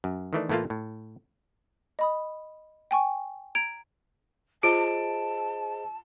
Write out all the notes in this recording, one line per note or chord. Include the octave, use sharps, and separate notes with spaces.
F#2
D#3 E3 A3 D4
A2 E3 A3 A#3 F4
A2
D#5 B5 D#6
G5 G#5 C#6
A#5 G#6 D7 F7
F4 G#4 C5 D#5 A5 D7